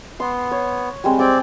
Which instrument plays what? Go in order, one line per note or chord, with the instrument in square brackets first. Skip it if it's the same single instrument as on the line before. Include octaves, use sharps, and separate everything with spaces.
[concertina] B3 [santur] C6
[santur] C#5
G3 G#3 C4
[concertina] C4 D5 [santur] G5 G#5